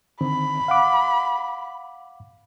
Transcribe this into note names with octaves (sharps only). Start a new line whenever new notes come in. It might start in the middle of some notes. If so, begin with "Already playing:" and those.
D3 D#3 C4 B5
F5 F#5 D6